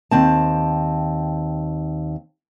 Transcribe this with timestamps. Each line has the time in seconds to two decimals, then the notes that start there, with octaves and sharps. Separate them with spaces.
0.12 D#2 C4 A5